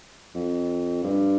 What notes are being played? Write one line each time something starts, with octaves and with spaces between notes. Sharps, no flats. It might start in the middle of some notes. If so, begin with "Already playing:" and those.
F2
G2